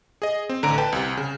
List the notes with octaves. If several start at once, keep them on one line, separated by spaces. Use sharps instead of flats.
G#4 D#5
C4
A1 D3 A#5 D7
B4 G5 A5
C2 C3
C#3